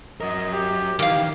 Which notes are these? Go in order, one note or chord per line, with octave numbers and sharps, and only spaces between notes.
F#3 A#4 D#5
G4
D#3 E3 A#3 G4 F5